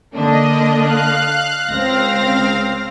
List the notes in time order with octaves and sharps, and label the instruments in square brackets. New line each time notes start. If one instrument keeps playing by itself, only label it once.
[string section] D3 A#3 D4 [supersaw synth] D#5
[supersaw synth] F5 F#6
[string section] C#2 A#6 [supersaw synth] C4 F5